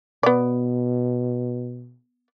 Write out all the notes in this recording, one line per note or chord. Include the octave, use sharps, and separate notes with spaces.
B2 B3 D5